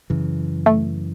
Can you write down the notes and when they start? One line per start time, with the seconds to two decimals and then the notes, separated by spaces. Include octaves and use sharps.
0.10 F#2 C#3 E3
0.66 A3